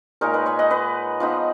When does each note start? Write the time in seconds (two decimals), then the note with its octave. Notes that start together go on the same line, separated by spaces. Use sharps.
0.21 A#2 G#3 D#4 A#4 C#5
0.34 B4 D#5
0.46 C#5 F5
0.59 D#5 F#5
0.71 B4 D#5
1.20 F3 B3 D#4